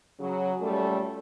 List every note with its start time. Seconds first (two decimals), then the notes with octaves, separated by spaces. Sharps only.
0.19 C#3 F#3
0.61 A#2 G3 A3 C#4 A4